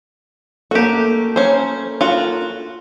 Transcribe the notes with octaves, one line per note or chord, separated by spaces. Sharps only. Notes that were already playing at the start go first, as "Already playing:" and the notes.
A3 A#3 F#4 G4
C#4 C5
F4 F#4